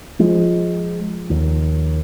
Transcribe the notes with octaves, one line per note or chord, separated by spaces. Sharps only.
F3 G#3
D#2 D#3